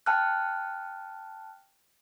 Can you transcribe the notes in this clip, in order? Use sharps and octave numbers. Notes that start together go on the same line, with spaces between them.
G5 A5 F6 F#6